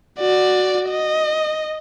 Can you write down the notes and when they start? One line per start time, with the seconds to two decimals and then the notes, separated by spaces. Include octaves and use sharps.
0.19 F#4 D5
0.90 D#5